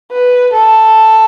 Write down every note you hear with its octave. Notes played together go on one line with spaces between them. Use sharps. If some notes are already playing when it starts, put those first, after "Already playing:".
B4
A4